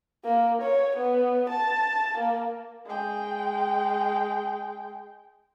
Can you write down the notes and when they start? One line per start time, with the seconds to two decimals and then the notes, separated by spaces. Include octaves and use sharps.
0.24 A#3
0.61 C#5
0.97 B3
1.49 A5
2.17 A#3
2.86 G#3 G5